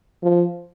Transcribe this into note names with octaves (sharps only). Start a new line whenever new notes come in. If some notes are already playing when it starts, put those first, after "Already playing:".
F3